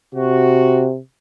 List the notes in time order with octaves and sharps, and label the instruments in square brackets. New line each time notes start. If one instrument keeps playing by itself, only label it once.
[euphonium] C3 [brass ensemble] F#4